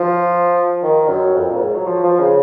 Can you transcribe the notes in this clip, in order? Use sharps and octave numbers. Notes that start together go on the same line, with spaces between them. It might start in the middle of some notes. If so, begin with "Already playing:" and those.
Already playing: F3
D#3
F#2
F2
A#2
G#2
F#3
F3
F3
C#3